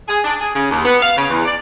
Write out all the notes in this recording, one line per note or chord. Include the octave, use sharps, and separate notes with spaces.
G#4
D4
G#4
C#3
D#2
B3
F5
C#3
E2
D5